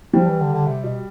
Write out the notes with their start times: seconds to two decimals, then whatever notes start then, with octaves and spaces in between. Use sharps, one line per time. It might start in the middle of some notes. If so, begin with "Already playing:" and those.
0.13 F3 G3
0.27 E3
0.40 D3
0.53 D3
0.67 C3
0.84 B2